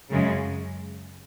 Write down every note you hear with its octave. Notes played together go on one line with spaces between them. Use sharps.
F#2 C#3 G#3